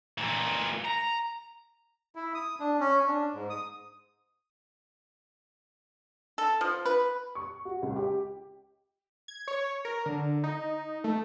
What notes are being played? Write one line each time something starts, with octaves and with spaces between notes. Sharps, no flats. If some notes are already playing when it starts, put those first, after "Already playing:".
A#2 E3
A#5
E4
D#6
D4
C#4
D4
G#2
D#6
A4
F3
B4
C#6
F#4
C#2
G4
G#6
C#5
A#4
D3
D#4
A3